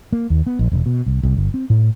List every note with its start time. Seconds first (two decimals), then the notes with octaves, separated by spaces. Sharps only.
0.13 A#3
0.30 D#2
0.47 B3
0.59 A#1
0.72 E1
0.86 B2
1.06 C2
1.23 C2
1.37 G1
1.54 C4
1.70 A2